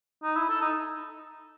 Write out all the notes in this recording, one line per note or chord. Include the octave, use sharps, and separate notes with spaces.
D#4
E4
A4
D#4